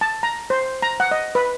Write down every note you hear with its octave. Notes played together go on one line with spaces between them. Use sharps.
A5
A#5
C5
A#5
F#5
D#5
B4